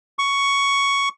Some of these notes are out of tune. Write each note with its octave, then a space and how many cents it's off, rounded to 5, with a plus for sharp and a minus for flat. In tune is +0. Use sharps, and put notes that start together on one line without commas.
C#6 +10